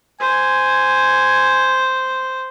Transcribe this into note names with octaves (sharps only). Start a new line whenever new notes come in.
C5 G#5